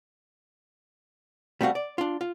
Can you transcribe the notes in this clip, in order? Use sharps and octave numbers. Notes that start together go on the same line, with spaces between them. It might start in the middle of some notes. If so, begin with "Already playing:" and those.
G3 A3 C4 F#4 F5
D5
D4 F4
F4